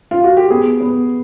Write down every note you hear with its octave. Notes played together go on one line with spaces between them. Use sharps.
F4
F#4
G4
B3 G#4
B3